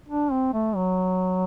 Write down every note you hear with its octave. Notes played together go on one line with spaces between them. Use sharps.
D4
C4
A3
F#3